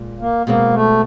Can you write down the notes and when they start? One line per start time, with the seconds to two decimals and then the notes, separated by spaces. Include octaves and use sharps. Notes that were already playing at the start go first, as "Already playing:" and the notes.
Already playing: A#2 G#3
0.20 A#3
0.46 B2 G#3 A#3 C4
0.73 A3